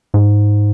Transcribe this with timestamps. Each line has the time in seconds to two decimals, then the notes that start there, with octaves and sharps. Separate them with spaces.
0.14 G#2